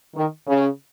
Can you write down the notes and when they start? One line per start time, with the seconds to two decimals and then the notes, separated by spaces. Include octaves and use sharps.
0.15 D#3
0.47 C#3